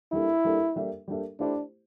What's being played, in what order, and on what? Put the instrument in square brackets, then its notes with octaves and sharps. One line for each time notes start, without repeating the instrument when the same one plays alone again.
[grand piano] G3 A#3 D4 A4 [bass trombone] E4
[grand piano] G3 A#3 D4 A4
G3 A#3 D4 A4 E5
G3 A#3 D4 A4 E5
[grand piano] A3 E4 G4 C5 [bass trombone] D4